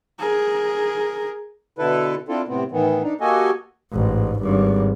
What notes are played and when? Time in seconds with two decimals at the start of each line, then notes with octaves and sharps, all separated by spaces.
0.19 G#4 A#4
1.78 B2 D3 E4 A4 B4
2.28 C4 D4 E4 F4 A4
2.48 A2 C3 B3 C4
2.71 A2 D#3 E3 B3
3.03 D4 D#4
3.21 A#3 F#4 G4 A4 D#5 G#5
3.92 A1 G#2
4.40 G#1 G2